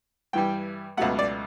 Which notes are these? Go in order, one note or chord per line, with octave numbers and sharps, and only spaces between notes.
G2 E3 G3 G5
C#2 B2 F#3 A3 F#5
D5